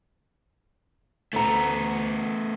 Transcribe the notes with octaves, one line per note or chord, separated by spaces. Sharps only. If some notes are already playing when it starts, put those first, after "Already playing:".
D2 A3 B3 A#5